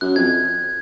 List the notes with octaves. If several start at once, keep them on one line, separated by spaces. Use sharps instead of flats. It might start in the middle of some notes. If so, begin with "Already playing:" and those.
F#2 F#6
F2 G#6